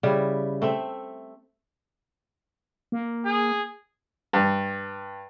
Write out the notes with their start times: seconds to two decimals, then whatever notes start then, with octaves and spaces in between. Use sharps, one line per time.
0.03 C#3 G3 E4 E5
0.62 A3 C4 E5
2.92 A#3
3.25 G#4
4.33 G2